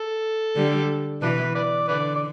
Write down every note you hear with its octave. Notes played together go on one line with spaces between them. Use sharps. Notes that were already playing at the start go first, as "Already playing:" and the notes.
Already playing: A4
D3 G3
B2 E3 D4 B4
B4 D5
D3 B4 D5
D5